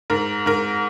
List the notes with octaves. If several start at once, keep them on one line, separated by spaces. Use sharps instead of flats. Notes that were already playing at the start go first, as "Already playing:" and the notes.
G#2 A#4
G#2 A#4